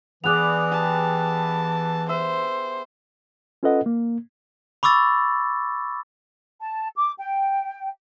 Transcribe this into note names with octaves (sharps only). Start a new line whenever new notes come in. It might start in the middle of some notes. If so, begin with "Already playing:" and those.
E3 B3 G#4 D5 D6 F#6 F7
G4 A5
C5 E5
C#4 F4 A4 B4 D#5 F#5
A#3
B5 C#6 D6 E6 A6
A5
D6
G5